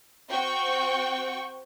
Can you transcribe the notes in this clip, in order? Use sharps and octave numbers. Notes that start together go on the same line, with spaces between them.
C4 F#4 G5 C#6